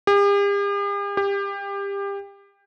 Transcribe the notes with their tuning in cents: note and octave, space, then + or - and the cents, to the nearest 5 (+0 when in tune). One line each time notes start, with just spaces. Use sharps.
G4 +45
G4 +25